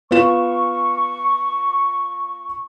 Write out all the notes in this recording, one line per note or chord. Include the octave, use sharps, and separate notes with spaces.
B3 F4 C#6 E7